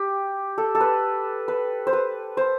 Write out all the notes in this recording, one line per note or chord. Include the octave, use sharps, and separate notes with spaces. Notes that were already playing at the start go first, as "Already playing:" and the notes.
Already playing: G4
A4
A4
B4
B4
C5
B4
C5